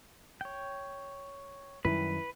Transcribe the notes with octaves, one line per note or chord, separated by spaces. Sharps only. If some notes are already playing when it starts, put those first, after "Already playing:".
C#5 G5
F#2 D#3 G3 E4 B4